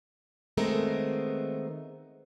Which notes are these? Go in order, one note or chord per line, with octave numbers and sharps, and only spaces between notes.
D#3 G#3 A3 B3 C4 A#4